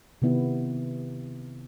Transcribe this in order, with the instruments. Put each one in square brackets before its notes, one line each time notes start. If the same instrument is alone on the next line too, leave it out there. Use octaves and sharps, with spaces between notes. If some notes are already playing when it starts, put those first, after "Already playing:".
[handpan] C3 D#3 B3 E4 G4